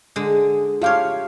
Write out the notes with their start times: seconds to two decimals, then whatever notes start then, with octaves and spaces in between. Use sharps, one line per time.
0.16 D3 G#3
0.82 A3 F4 G4 C#5 F5